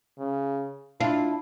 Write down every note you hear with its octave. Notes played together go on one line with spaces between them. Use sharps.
C#3
D4 E4 F4